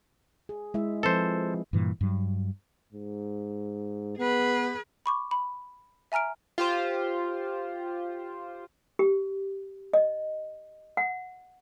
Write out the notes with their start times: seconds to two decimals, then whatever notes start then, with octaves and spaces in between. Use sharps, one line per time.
0.49 G#4
0.74 G#3 E4 E5
1.03 F3 C4 A4 B4 C5
1.73 G2 A#2 E3
2.01 G2 F#3
2.93 G#2
4.19 B3 G#4 B4
5.06 B5 C#6 D6
5.31 B5
6.12 E5 G#5 A#5 F6 D7
6.58 F4 G4 C5
8.99 G4
9.93 D#5
10.97 F#5